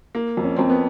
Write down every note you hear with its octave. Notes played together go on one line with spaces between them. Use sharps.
A#3
F2
C#4
F2 C4
B3